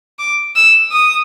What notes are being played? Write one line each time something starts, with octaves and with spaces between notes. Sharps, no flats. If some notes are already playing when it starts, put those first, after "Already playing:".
D6
E6
D#6